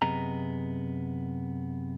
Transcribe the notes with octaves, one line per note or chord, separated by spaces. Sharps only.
F#2 C3 B3 G#4 D#5 A#5